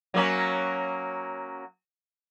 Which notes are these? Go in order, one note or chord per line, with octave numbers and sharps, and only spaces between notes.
F#3 A#3 C#4